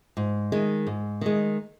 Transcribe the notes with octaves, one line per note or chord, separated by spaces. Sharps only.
G#2
D#3 G#3
G#2
D#3 G#3